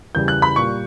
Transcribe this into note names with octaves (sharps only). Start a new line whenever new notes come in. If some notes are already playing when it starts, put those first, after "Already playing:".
E2 C#3 G3 G6
F#6
B5
A#2 G3 C#6